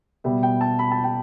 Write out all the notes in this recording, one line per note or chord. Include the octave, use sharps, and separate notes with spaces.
B2 G3 B3 E5
G5
A5
B5
A5
G5